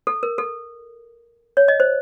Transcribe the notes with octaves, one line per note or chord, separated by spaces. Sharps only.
A4
A#4
A4
C#5
D#5
C5